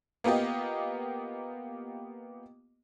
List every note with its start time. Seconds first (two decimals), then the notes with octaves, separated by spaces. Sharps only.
0.24 A#3 B3 F4 G4 D#5